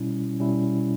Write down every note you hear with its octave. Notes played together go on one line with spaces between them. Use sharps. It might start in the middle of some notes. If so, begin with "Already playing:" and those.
Already playing: B2 G3 C#4 E4
B2 G3 C#4 E4